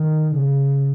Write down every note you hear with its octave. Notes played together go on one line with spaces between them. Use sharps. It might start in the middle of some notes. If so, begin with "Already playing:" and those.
Already playing: D#3
C#3